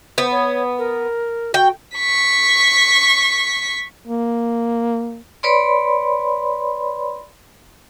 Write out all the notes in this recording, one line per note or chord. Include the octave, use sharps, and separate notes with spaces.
B3 C5
C#5
A#4
F#4 G5
C#6 B6
A#3
B4 C#5 D5 B5 C6